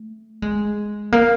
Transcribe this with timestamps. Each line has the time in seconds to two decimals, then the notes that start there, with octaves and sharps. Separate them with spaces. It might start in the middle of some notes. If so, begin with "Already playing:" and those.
Already playing: A3
0.42 G#3
1.12 A#3